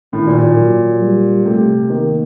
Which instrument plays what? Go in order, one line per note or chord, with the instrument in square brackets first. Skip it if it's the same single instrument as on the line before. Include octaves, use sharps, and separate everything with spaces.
[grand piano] A2 [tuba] D#3
[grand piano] A#2
A#2
[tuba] F#3
G3
[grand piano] C3 [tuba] A3
[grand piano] D#3 [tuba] A#3